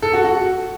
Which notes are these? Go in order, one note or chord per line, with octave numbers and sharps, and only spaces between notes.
A4
F#4
F#4